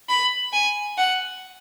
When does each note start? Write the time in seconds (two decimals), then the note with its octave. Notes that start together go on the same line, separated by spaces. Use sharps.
0.09 B5
0.53 G#5
0.98 F#5